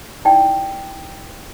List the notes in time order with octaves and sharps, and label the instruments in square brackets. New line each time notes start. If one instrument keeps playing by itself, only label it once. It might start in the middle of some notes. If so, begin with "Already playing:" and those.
[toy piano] D#4 E4 D5 G5